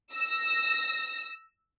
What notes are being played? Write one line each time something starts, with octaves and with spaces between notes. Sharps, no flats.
E6 A#6